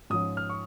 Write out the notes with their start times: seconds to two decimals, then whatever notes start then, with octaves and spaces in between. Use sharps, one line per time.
0.10 G#2 F3 C#4 D#6
0.37 F6
0.49 C#6